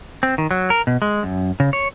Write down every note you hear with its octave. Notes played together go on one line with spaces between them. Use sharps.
C4
D#3
F#3
A#4
B2
G#3
F#2
C#3
C#5